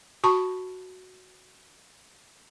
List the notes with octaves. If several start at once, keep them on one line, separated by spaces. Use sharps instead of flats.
F#4 A5 B5 C#6